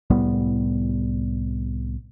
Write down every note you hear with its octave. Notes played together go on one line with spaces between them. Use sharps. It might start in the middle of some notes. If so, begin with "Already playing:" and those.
C2 A2 G3 B3